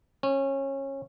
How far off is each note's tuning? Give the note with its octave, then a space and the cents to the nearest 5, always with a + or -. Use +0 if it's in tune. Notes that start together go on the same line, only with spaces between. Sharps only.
C#4 -20